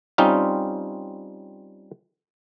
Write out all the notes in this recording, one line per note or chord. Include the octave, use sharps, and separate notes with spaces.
G3 C4 C#4 D#4 F4